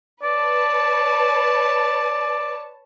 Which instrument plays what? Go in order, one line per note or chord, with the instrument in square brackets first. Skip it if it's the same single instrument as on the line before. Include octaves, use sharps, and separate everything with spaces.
[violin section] B4 C#5 A5 [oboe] D5